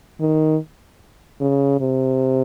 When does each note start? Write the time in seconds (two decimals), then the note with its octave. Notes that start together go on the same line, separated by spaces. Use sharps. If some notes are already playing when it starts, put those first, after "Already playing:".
0.21 D#3
1.41 C#3
1.81 C3